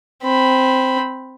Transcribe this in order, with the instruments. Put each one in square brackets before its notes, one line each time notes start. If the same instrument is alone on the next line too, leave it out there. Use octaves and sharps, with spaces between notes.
[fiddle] C4 B5